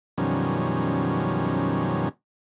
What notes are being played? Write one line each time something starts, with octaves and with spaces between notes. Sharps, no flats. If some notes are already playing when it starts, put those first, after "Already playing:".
F#2 B2 D#3 F3 G3 C#4